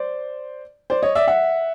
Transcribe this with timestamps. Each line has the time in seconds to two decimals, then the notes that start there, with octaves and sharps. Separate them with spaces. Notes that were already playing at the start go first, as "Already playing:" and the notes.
Already playing: C5 D5
0.90 C5 D5
1.03 C#5 D#5
1.15 D5 E5
1.28 E5 F#5